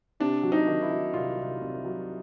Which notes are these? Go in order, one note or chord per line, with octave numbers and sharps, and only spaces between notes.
C3 D4
F#3
D#4
D#3
E4
F#3
C2 F4
C2
C2
F#3